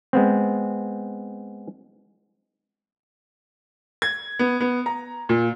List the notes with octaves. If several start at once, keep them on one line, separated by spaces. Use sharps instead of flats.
G#3 B3 C4
G#6
B3
B3
A#5
A#2